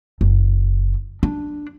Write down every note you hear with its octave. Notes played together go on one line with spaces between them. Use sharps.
F#1
D4